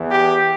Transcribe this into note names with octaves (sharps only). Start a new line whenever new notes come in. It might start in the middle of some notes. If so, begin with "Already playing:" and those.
Already playing: E2 E3
G4